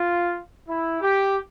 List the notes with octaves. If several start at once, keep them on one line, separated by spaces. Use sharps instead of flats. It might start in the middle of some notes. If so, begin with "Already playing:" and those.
Already playing: F4
E4
G4